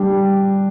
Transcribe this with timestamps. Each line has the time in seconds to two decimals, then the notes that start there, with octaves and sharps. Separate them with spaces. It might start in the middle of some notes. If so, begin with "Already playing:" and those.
Already playing: G3 D4